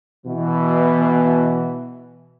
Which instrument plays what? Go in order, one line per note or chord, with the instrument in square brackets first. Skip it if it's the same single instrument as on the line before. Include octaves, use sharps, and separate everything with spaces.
[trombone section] B2 E3